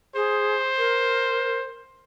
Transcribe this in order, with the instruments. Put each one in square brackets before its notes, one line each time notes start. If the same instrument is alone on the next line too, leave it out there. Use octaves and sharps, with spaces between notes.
[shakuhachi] G#4 [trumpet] C5
[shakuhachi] A#4